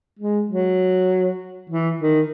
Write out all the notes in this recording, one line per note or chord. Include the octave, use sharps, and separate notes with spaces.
G#3
F#3
E3
D#3